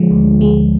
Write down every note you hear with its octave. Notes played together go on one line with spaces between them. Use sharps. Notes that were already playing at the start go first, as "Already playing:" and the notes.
Already playing: D3 F3 G#3
D2
G#3